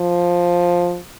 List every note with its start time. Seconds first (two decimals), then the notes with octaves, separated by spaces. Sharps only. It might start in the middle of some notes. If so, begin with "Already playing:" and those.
Already playing: F3